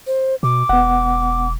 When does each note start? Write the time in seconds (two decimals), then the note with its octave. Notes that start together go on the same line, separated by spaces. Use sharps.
0.07 C5
0.43 B2 D6
0.69 E1 B3 F#5